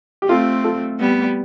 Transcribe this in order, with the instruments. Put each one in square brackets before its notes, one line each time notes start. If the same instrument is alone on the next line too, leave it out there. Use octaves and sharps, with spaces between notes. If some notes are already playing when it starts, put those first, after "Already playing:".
[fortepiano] G4
[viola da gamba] A3 C4 [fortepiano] F4 A4
[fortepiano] F4 A4
[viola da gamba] G3 B3